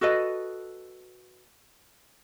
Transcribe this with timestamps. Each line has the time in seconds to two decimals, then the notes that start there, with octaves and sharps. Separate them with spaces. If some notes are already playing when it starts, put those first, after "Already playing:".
0.01 F#4 A4 B4 D#5